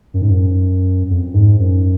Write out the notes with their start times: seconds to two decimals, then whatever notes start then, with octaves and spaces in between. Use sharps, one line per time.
0.14 F#2
0.22 G#2
0.30 F#2
1.10 F2
1.34 G#2
1.59 F#2